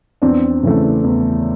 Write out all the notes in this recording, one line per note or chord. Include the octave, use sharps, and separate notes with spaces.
E2 C4 D4
C#3 E3 A3
E2